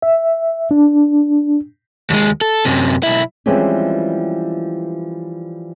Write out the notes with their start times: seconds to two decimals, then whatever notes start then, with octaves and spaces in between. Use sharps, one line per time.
0.02 E5
0.71 D4
2.10 D#2 G#3
2.41 A4
2.65 F#2 C3
3.03 B1 E4
3.46 E3 F3 G3 G#3 C4 C#4